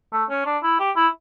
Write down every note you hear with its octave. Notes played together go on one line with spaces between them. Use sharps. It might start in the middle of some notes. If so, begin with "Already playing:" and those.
A3
C#4
D4
E4
G4
E4